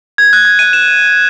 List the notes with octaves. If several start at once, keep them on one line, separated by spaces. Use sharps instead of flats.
G#6
F#6
G#6
D#7
E7